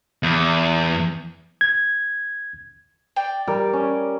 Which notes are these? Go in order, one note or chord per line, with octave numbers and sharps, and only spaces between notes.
E2
G#6
D5 G5
G3 A#4
C#4